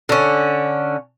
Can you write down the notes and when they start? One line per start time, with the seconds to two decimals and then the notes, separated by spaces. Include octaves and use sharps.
0.09 D3 C#4